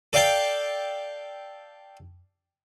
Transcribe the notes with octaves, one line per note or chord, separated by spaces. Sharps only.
A4 D5 F5 G5 A5